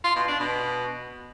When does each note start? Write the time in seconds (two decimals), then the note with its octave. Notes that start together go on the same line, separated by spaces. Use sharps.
0.04 F4
0.16 B2
0.28 D4
0.40 B2